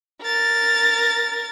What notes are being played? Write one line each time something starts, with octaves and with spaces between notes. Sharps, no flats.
A#4 A6